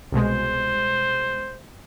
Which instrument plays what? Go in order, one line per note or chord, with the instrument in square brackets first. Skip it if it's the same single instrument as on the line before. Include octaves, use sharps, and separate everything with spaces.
[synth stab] C2 B2 G#3 [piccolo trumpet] C5